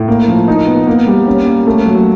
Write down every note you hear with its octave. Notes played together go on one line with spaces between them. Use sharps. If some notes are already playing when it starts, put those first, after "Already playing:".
Already playing: A2
A#3
F3
D#4
B3
A#3
G3
C#4
A#3
A3
F#3